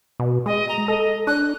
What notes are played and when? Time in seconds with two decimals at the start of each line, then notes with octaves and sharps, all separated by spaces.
0.20 B2
0.46 G#3 D#5
0.69 A#5
0.88 A4 D#5
1.27 D4 F#6